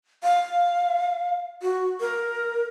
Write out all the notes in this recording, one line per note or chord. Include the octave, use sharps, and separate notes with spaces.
F5
F#4
A#4